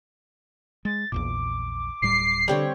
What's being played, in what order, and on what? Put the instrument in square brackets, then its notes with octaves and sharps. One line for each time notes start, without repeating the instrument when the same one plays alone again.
[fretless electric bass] G#3 [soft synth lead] A6
[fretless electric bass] A#1 E2 A#2 [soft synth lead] D6
[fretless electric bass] D1 A2 G3 [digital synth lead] C7
[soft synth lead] D3 [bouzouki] G3 C4 C#5